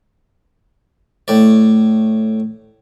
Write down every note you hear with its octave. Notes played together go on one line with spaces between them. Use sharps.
A2 D5